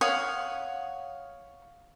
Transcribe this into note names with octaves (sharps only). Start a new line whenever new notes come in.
C#5 F5 F#5 D#6